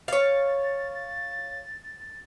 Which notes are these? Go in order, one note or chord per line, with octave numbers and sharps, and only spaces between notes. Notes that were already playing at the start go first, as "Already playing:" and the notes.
C#5 F5 A6